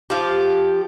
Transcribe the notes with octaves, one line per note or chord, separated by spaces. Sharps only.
F3 G4